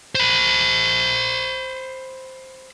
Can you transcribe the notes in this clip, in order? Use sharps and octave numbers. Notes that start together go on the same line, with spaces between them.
C5 B5